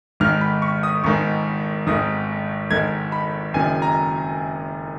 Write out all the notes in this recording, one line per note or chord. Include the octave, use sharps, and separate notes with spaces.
G#1 G#2 D#3 F6
B5
C#6
D#6
G#1 G#2 D#3 C#6
G#1 G#2 D#3 D#6
G#1 G#2 D#3 G#6
B5
F#1 F#2 D#3 G#5
A#5